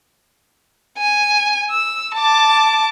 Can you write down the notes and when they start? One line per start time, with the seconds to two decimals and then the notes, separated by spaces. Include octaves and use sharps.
0.98 G#5
1.71 E6
2.15 A5 D6